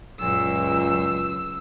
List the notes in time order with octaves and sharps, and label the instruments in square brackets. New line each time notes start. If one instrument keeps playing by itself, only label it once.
[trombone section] C#2 [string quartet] F#2 [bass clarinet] A#2 [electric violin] E6